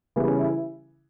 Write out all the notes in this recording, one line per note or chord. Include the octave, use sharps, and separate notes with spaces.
C#3 E3 G3 B3
C#4
E4